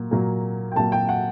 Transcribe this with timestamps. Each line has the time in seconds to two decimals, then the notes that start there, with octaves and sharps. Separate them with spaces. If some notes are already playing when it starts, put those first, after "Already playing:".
Already playing: A#2 F#3 A#3
0.11 A#2 F#3 A#3
0.72 G5
0.76 A#2 F#3 A#3 A5
0.92 G5
1.09 F#5